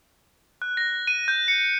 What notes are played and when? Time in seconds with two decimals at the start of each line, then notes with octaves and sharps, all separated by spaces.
0.62 F#6
0.77 A#6
1.07 D#7
1.28 G6
1.48 C#7